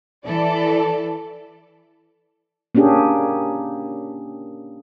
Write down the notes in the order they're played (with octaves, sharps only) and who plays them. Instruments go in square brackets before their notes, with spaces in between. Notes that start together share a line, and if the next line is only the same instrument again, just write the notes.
[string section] E3 A4 D5
[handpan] A#3 C#4 D4 G4 G#4